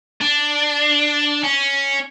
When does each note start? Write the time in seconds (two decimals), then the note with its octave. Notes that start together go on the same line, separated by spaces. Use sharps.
0.21 D4
1.44 C#4